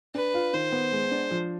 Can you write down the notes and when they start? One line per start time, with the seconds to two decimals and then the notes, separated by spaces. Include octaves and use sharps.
0.15 D4 B4
0.34 F4
0.53 D#3 C5
0.72 B3
0.92 G#3
1.11 D4
1.31 F3